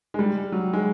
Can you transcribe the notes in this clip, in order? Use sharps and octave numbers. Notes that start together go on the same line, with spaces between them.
G#3
G3
F#3
G#3